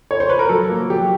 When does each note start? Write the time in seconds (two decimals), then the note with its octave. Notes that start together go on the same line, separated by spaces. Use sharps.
0.11 C#5
0.20 C5
0.29 B4
0.39 A#4
0.49 F#3 A4
0.70 A#3
0.90 F#3 G4